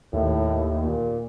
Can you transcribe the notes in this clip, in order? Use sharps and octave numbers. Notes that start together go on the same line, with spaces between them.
D#2 A2
A#2